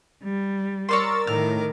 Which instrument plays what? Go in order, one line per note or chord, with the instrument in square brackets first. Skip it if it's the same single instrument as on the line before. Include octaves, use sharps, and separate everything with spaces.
[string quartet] G3
[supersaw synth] A#4 E6 A6 [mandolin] C#5 D5 C6
[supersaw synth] A2 [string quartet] D#3 A#4 D6 [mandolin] F6